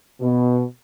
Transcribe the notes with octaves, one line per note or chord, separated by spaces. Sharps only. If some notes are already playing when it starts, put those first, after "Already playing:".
B2